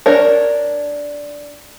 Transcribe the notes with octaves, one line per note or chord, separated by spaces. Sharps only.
D4 A#4 C#5